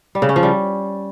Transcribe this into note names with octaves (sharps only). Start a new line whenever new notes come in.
G3
C#3
C#4
F3
G3